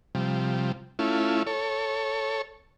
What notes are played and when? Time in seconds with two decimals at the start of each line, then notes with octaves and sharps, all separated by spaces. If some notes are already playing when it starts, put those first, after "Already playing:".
0.15 C3 F3 G3
0.99 A3 C#4 E4 F4
1.47 A4 C#5